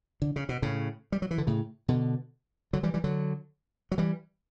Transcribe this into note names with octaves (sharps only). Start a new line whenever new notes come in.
D3
C#3
B2
A2 C#3
G3
F#3
E3
D3
A2 C#3
B2 D3
D3 F#3
E3 G3
E3 G3
D3 F#3
F#3
E3 G3